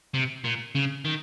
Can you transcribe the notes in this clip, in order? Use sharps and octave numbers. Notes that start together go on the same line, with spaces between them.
C3
A#2
C#3
D#3